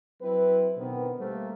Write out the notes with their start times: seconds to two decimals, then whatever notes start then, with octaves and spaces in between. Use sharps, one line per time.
0.21 F#3 C4 E4 B4
0.76 B2 D3 D#3 B3 C4
1.19 G3 A3 A#3 C4